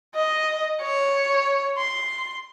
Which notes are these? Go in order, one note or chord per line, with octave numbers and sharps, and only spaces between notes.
D#5
C#5
C6